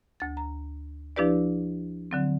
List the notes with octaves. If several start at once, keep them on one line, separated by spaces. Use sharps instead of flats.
D2 A6
A#5
F3 D4 E4 G4 B4 D5
D3 F#3 C4